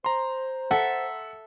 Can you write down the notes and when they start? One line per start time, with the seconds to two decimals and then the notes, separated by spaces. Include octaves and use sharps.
0.04 C5 A#5 C6
0.71 A4 E5 F#5